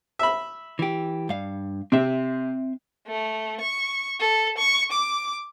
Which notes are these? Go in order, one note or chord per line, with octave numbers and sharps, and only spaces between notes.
E5 B5
E3 G4
G2 F5
C3 C4 E5
A3
C#6
A4
C#6
D6